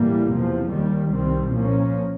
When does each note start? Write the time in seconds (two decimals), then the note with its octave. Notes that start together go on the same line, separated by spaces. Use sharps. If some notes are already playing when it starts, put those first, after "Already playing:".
Already playing: A2 E3 G3 A#3
0.31 E2 C3 F3
0.71 D#2 D#3 G3
1.12 C2 C3 D#3 G3 C4
1.52 A#2 F3 A#3 C#4